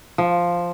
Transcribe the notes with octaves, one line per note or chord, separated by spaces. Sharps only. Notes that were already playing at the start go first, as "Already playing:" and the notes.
F3